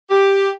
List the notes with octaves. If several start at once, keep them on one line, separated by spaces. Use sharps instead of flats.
G4